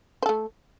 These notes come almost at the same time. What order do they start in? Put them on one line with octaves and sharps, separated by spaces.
C5 A4 A3